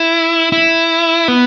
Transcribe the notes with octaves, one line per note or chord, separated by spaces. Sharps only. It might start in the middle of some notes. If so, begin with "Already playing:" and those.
Already playing: E4
E4
B3